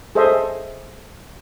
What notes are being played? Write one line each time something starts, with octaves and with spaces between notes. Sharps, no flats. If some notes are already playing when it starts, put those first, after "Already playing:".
G#4 A4 C5 D#5 E5